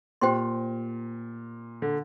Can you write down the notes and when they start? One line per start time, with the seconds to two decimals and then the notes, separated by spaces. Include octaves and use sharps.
0.21 A#2 G4 C5 G5 C6
1.82 D3